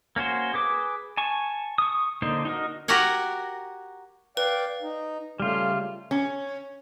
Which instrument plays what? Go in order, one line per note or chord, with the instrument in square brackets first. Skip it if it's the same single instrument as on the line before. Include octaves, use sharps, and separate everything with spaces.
[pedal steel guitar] A#3 C#4 F#4 C5
G#4 B4 D6
G#5 A5 C#6
C#6 D#6
D3 A#3 D4 D#4 C5
D#4 F#4 A#4
[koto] F#4 G4 A#4 F#5 G#5
[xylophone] B4 [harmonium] D5 F5 G5
[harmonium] D#4
[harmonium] C#3 A3 [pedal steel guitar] G3 F4
[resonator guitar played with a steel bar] C#4